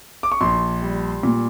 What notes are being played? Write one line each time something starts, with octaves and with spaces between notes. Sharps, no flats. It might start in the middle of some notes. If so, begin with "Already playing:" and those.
D6
C#6
A#1 C6
G3
A#2